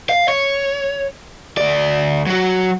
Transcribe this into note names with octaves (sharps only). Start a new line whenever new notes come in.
F5
C#5
D2 D5
F#3 F#4